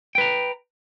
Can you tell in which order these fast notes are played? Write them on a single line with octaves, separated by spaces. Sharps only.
G5 B4 A#5